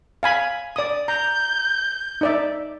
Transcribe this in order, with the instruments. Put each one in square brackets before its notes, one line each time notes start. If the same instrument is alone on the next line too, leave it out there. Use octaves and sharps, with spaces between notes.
[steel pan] F5 G#5 B5
D5 D#6
[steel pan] A#5 [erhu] G6
[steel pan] D#4 D5 E5